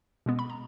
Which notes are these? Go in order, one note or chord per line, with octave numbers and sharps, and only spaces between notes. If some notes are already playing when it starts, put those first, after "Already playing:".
B2 G#3 B3
B5
A#5